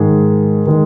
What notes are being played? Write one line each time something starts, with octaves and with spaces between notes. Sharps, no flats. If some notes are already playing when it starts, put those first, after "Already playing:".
Already playing: G#2 D#3 G#3 G#4
D#3 G#3